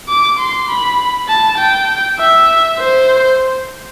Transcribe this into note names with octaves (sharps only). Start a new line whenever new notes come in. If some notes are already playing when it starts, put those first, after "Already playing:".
D6
C6
B5
A5
G5
E5
C5